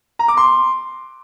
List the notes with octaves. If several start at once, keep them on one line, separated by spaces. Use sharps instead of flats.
A#5
D6
C6